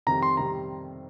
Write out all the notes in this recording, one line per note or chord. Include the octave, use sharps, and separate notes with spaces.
F2 C3 D#3 G3 A#5
C6
C3 D#3 G3 A#5